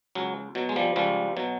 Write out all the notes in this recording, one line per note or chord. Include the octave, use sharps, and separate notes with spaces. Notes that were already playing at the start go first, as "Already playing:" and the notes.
C#2 F#3
B2 F#3
G#3
F3 G3
C#2 F3 G3
B2 F#3